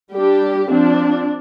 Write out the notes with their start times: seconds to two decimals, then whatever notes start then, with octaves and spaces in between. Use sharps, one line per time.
0.14 G3 D4 G4
0.68 F3 C4 D4